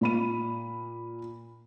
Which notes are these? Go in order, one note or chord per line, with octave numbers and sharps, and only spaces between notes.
A#2 B5 D#7